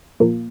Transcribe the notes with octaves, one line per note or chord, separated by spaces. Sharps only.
A#2 F3 A#3